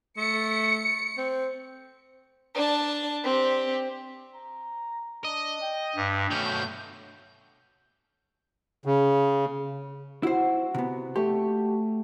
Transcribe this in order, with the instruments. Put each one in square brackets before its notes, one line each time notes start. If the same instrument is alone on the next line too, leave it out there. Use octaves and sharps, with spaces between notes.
[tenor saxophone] A3 [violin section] C#7
[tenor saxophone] C4
[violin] D4 A5
C4 G4
[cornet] A#5
[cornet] D4 [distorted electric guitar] D#5
[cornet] G5
[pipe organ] G2
[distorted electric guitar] B2 C#4 [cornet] A3 [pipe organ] G6
[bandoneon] C#3
[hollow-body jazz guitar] E4 C5 [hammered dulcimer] F#4
[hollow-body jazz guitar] C3 B3
[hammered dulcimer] A3 C#6 [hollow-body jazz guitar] G4